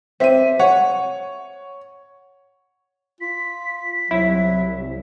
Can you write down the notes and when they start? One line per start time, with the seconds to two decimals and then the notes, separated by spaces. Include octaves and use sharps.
0.20 C4 G4 E5 D#7
0.60 C#5 F#5
3.21 F4 B6
4.11 C2 F#3 E4